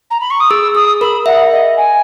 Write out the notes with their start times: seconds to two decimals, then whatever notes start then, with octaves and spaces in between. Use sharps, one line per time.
0.10 A#5
0.20 B5
0.30 C#6
0.40 D#6
0.50 G#4 E6
0.75 G#4 D#6
1.01 A#4 B5
1.26 E5 F#5
1.52 D#5
1.77 G#5